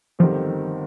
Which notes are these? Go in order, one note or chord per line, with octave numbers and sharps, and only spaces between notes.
G1 D#3 F3 C4 G4